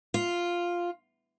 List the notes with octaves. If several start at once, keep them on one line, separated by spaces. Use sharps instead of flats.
F4